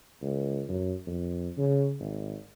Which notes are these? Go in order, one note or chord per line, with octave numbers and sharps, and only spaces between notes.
C#2
F#2
F2
C#3
G#1